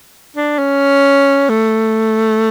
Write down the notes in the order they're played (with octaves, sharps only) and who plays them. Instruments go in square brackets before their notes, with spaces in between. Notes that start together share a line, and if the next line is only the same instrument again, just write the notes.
[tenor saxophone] D4
C#4
A3